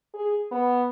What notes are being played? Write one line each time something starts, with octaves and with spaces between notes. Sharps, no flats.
G#4
B3